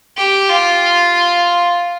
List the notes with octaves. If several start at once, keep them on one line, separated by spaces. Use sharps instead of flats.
G4
F4